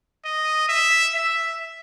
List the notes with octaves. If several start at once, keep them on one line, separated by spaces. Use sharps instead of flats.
D#5
E5
E5